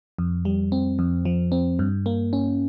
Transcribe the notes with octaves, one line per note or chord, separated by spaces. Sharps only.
F2
G3
C4
F2
F3
C4
G2
A#3
C#4